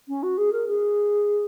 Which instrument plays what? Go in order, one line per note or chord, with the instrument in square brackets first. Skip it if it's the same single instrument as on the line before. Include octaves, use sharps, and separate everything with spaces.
[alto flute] C#4
F#4
G#4
A#4
G#4